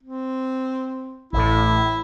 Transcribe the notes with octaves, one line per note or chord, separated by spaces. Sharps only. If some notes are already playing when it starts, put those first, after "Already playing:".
C4
A1 A2 E4